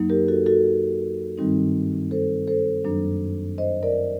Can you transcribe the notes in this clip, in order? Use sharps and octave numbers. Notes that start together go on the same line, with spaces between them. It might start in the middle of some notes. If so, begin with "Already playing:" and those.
Already playing: F#2 F#3 A#3 D#4
G4 A#4
F#4 A4
F#4 A4
G2 D#3 G3 C4 D#4
A4 C5
A4 C5
F#2 D#3 F#3 A#3 D4
C5 D#5
A#4 D5